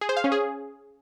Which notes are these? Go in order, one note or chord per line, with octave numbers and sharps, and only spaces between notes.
G#4
C5
F5
C#4
G#4